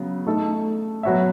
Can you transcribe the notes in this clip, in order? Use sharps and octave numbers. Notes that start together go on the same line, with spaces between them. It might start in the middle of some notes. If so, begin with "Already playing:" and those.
Already playing: C#3 F#3 B3
A3 D#4 A4
F#3 B3 F#4 C#5 E5